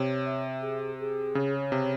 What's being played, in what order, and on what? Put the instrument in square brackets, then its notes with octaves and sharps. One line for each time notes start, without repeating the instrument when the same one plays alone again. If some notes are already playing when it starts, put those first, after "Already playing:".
Already playing: [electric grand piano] C3 [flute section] C#5
[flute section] E5
G#4
G#4
[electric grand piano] C#3 [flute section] C#5
[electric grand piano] C3 [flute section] E5